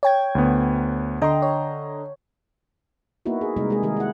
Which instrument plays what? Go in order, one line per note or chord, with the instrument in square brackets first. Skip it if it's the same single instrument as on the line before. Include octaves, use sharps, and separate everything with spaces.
[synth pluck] C#5 G5 G#6
[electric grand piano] D2 B3
[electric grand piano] D3 D#5 A#5 [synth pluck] G5 C6
[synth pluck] C#5
[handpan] A#3 B3 D#4 E4 F#4
G#4
C3 G3 G#3 D#4 A#4
G#3 G#4
D#3 G3 G#4 A#4
E4 F#5